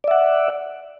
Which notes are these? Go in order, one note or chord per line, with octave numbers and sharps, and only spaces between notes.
D5 E5 F#5